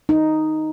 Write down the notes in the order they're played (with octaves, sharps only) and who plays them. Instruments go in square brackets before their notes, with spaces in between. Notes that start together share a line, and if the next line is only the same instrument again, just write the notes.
[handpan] D#4